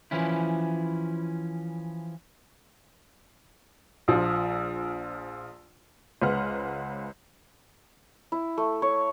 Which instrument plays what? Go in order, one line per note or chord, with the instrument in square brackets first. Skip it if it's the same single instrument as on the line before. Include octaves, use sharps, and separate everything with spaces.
[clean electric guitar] E3 F3 C#4 E4
[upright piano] A#1 F3
[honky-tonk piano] C#2 C#3 B4 C5 F#5 F6
[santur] E4
A3
C#5